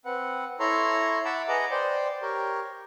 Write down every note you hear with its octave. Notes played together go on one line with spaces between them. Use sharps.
C4 B4 F#5
E4 A4 C#5 A#5 C6
E5 F#5 A5 B5 D6 E6
G#4 B4 D#5 F#5 A#5 D6
C5 D5 G5
G4 A#4 C#5